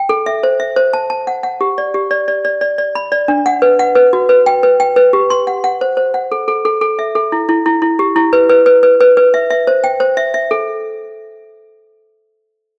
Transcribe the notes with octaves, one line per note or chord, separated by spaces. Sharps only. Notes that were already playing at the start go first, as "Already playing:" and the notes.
Already playing: G5
A4
E5
C5
E5
C5
A5
A5
F#5
F#5
G4
D5
G4
D5
D5
D5
D5
D5
B5
D5
D4
F#5
B4
F#5
B4
F#4
B4
G5
B4
G5
B4
G4
C6
F#5
F#5
C5
C5
F#5
A4
A4
A4
A4
E5
A4
E4
E4
E4
E4
G4
E4
B4
B4
B4
B4
B4
B4
E5
E5
C5
G5
C5
E5
E5
A4